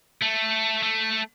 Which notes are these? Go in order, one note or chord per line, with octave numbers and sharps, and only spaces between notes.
A3
A3